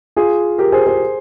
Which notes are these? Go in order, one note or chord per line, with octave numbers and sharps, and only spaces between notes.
F4 G#4
G4 A#4
G#4 C5
G#4 C5